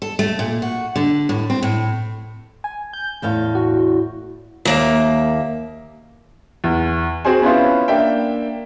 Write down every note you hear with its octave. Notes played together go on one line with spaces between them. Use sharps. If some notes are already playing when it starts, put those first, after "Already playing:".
A4
A3
A#2
F#4
D3
A2
C4
A2
G#5
G6
E2 A2 F5
F#4
D#2 A#3 E5
E2
C4 F#4 G#4 C5 G#5
B3 C#4 E4 F4 B4 C5
A#3 D4 E5 G5